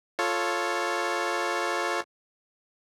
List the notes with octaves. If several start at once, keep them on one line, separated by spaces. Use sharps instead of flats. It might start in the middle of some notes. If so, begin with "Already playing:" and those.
F4 A4 C#5